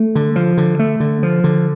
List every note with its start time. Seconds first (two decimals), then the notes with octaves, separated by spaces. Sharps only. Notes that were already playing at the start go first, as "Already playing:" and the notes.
Already playing: A3
0.15 D3
0.36 F3
0.57 D3
0.79 A3
1.00 D3
1.23 F3
1.44 D3